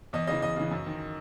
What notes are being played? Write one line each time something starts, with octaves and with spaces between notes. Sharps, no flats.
E2 D#5
C#3 E3 D#5
E2 D#5
C#3 E3
F#2
D#3